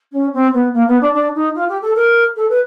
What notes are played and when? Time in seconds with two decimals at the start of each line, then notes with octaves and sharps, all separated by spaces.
0.12 C#4
0.33 C4
0.54 B3
0.73 A#3
0.87 B3
1.01 D4
1.14 D4
1.35 D#4
1.55 F4
1.68 G4
1.82 A4
1.95 A#4
2.36 A4
2.49 B4